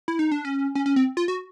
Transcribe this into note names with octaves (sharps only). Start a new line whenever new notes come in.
E4
D#4
D4
C#4
C#4
C#4
C4
F4
F#4